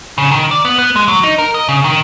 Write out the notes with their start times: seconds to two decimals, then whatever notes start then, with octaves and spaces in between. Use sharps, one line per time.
0.18 C#3
0.31 D#3
0.51 D5
0.65 B3
0.78 B3
0.96 G#3
1.08 F#3
1.23 D#4
1.39 A#4
1.54 D#5
1.69 C#3
1.84 D#3